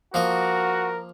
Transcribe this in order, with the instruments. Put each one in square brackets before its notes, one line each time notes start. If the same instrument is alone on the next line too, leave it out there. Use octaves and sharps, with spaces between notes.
[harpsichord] F3 A#3 D#5 [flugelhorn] F#4 [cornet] A#4